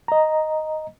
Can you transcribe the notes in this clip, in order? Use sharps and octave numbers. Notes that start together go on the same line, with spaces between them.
D#5 A#5